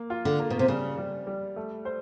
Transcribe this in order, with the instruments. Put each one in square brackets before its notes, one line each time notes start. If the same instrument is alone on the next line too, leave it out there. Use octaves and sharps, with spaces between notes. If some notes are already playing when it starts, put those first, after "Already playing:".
Already playing: [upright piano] A#3
F4
[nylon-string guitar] D3
[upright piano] A#3
[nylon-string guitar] B2
C3
[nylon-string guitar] C#3 [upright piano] G3
[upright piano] G3
G3
A3
C5